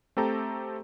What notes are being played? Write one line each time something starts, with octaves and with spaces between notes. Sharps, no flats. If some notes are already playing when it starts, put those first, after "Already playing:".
A3 C4 G4 A4 A#5